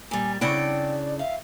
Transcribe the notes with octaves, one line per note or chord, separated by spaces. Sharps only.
A#2 G3 G#5
C#3 C4 D4 E4 D5 F#5 G5
E5 F5